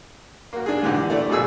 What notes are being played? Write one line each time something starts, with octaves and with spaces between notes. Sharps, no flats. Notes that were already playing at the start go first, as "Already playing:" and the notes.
A#3 F#4
D4 G#4
G#2 D3 E3 F#4 G4
A3 E4 D5
G#1 B2 A#3 G#4 E6